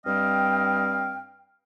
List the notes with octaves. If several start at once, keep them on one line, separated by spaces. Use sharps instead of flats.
G2 G3 C4 D#5 F5 G5